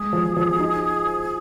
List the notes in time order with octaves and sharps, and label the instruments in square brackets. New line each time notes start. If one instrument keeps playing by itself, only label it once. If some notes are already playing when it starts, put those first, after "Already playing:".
Already playing: [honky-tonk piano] G#3 [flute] G#4
[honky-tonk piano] F3
F3
D#4